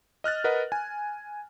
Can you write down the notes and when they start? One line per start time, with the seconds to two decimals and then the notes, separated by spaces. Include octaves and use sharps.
0.24 D#5 F6 F#6 A6
0.44 A#4 B4 D#5 F#5
0.72 G#5